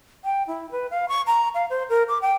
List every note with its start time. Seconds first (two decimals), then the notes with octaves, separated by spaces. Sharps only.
0.24 G5
0.47 E4
0.71 B4
0.91 F5
1.09 C#6
1.27 A#5
1.54 F5
1.70 C5
1.89 A#4
2.08 D6
2.22 G5